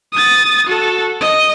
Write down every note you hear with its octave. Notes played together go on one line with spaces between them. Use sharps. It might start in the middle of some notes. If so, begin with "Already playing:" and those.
D#6 A6
F#4 A4
D#5